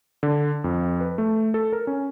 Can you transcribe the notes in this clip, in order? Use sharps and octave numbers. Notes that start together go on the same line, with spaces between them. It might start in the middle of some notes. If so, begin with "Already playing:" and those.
D3
F2
B4
A3
A4
A#4
C#4